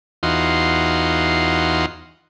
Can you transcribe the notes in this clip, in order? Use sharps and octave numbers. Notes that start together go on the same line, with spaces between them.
E2 D#4 F4 F#4 C6